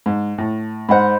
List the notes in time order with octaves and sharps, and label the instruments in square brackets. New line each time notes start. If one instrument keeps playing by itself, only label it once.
[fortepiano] G#2
A2
[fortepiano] G#2 D#5 F#5 [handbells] C5 B5